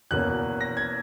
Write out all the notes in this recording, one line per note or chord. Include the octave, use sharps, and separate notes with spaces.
E2 B2 A#3 C#4 F#6
A#6
G#6